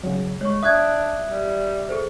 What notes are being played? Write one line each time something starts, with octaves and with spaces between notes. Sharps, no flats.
C#3 F#3
G#3 C#5 C#6
D4 E5 D#6 F#6 G#6
G3
G#4 A4 C5